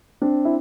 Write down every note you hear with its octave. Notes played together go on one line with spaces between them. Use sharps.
C4 D4
E4